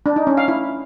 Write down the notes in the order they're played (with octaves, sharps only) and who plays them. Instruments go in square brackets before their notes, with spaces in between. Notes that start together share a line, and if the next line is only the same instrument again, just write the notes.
[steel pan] D4
D#4
C#4
F5
E4